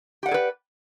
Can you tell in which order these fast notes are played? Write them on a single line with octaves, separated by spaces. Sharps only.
G4 F#5 D5 G#4 B4